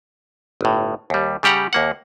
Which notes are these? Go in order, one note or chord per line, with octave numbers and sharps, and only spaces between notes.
G1 A2
D#2 G3
C#3 G3 G4 F#5 A#5
D#2 A#3 F#5